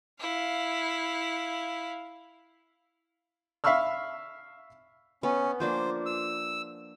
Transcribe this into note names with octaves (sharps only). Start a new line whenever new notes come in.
E4 F5
E5 F5 B5 C#6 E6 F6
B3 C#4
F3 A#3 D4 C5
E6